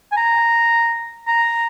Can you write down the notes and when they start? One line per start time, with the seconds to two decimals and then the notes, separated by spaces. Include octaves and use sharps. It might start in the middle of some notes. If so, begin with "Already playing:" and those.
0.12 G#5
0.17 A#5
1.28 A#5